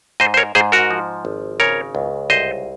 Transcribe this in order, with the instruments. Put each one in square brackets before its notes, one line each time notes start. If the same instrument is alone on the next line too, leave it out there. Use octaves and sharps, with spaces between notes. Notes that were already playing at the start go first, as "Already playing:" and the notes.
[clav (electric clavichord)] G#2 C5 D#5
C5
A#4 C#5
G#2 G#4 C5
F#4 A#4
F3
G#1
C#3 A#4 C#5
C#2
C2 C5 D#5